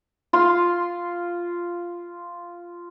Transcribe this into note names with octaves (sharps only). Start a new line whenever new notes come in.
F4 C6